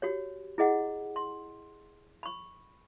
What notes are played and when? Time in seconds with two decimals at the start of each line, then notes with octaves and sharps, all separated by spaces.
0.02 F#4 G4 C#5
0.58 E4 G#4 D#5 F#5
1.16 C6
2.23 B5 C#6